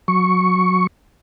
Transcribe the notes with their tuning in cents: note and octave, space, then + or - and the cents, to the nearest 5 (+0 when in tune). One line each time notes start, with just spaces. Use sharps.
F#3 -15 C#6 +0